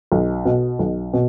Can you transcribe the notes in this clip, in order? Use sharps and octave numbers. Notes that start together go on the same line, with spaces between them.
B1
B2
B1
B2